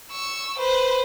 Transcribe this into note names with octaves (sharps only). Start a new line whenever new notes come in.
C#6 E6
B4 C5